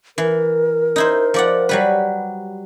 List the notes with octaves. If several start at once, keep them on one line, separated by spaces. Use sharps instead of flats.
E3 A#4
D#4 E4 C5
F3 D5 F#5
F#3 G3 B4